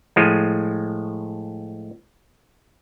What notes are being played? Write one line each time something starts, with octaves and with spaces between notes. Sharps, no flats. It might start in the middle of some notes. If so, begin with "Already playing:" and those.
A2 F3 G#3